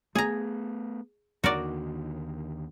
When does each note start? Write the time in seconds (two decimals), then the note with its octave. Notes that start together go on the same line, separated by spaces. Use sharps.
0.15 A3 B3 G#4 A#5
1.44 D#2 D3 D#3 F#4 A#4 D5